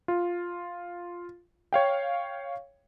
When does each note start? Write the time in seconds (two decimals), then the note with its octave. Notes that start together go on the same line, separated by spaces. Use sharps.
0.08 F4
1.73 C#5 F5 G5